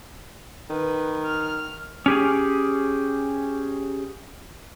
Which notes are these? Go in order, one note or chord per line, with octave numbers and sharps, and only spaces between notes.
D#3 B4
F6
C#4 G4 G#4